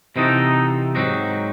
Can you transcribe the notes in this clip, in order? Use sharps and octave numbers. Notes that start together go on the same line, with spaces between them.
C3 E3 C4 D#4 F#4 A4
G#2 F#3 C4 D#4 F#4